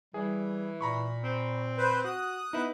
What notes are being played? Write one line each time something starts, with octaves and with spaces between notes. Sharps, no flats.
E3 G3 G#4
A#2 A#5 B5 C#6
C4
B4 C5
F#4 D#6 F#6
B3 D#4 E4 B4